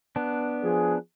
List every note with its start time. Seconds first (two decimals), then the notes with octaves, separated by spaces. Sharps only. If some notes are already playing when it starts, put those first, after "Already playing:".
0.16 B3 D4
0.63 F3 G#4